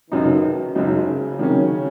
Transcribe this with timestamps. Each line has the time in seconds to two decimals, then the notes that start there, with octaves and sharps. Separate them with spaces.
0.11 F#1 F#2 B2 D#3 F#3 D#4
0.75 F#1 F#2 C#3 F#3 D#4
1.39 D#3 F#3 C#4